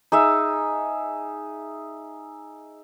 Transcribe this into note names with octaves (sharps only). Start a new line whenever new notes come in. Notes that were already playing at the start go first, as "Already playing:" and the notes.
D#4 G#4 E5